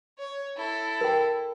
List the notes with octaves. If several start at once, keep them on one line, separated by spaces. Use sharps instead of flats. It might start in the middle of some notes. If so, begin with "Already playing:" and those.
C#5
E4 A4
A#4 G5